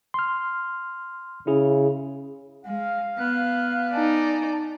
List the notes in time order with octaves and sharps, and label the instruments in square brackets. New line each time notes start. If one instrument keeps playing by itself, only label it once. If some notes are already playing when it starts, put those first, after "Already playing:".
[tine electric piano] C6 F6
[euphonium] C#3 [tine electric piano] E4 G#4
[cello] G#3 [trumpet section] F5
[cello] B3 [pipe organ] F#6
[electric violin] D#4 D5 [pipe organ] G#5 A5